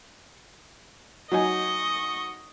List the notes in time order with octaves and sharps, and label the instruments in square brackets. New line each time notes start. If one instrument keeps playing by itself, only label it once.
[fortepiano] F#3 D#4 G#5 [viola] D#5 C#6